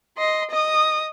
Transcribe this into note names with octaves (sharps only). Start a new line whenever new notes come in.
D#5 C6
D#5 D#6